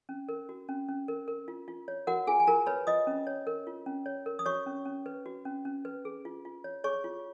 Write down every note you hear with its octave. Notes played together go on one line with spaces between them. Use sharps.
C#4
A#4
F#4
C#4
C#4
A#4
A#4
F4
F4
C#5
F#4 A#4 F#5
F4 G#4 G#5
G#5
F4 A#4 A#5
B4 C#5 B5
F4 D#5 D#6
C#4
C#5
A#4
F4
C#4
C#5
A#4
D#6
F#4 C#5 C#6
C#4
C#4
B4
F#4
C#4
C#4
B4
G#4
F4
F4
C#5
G#4 C#5 C#6
F4